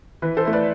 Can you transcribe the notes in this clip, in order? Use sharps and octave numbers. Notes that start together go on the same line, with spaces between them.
E3 B4
A4 C5
A3 E4
B4 D5